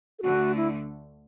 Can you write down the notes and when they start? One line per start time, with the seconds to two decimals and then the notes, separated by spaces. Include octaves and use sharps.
0.19 A4
0.22 D2 D3 A3 F#4
0.56 E4